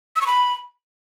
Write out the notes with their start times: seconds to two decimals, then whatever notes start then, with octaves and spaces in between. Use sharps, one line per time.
0.16 E6
0.21 C#6
0.27 B5